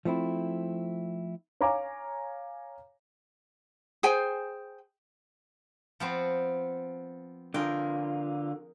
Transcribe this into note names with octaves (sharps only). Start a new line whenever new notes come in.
F3 A3 C4 E4
C#5 F5 G#5 A#5 D6
G#4 C5 G5 G#5
F3 B3 C4
D3 F4 G#4 A#4 G5